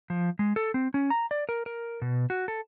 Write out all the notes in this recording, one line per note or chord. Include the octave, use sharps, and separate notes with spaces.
F3
G#3
A4
C4
C#4
A#5
D5
A#4
A#4
B2
F#4
A4